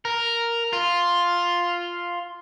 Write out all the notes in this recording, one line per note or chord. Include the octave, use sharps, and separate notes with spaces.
A#4
F4